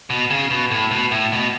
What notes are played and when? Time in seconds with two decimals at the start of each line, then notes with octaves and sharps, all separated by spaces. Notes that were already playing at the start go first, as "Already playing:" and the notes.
0.10 B2
0.30 C#3
0.50 B2
0.71 A2
0.91 B2
1.11 A2
1.32 B2